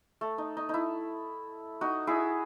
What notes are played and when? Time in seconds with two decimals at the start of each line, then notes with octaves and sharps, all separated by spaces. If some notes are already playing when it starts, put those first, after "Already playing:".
0.21 A3
0.38 D#4
0.57 D#4
0.69 D#4 E4
1.81 D#4 F#4
2.07 E4 G#4